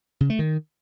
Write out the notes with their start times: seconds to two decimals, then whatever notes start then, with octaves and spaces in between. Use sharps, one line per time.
0.21 C#3
0.30 A3
0.39 D#3